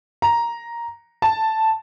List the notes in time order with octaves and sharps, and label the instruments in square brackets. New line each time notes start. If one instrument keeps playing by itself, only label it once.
[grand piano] A#5
A5